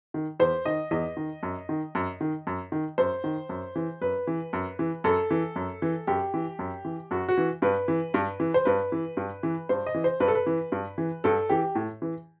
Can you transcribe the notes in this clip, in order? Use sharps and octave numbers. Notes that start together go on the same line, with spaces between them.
D#3
E2 C5
D#3 D#5
E2 D#5
D#3
F#2
D#3
F#2
D#3
F#2
D#3
F#2 C5
D#3
F#2
E3
F#2 B4
E3
F#2
E3
F#2 A4
E3
F#2
E3
F#2 G4
E3
F#2
E3
F#2 F#4
F#4
E3
G2 B4
E3
G2
E3
C5
G2 B4
E3
G2
E3
G2 C5
D#5
E3
C5
G2 B4
A4
B4
E3
G2
E3
G2 A4
E3 G4
A2
E3